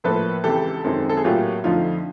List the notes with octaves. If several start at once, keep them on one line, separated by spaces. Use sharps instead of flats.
A2 F3 A#3 A4 B4
C#2 C3 E3 G4 A4
F#2 D#3 G#3 C4
A4
G#4
A2 F#3 A#3 F4 G4
F2 D3 F3 A3 D#4 F4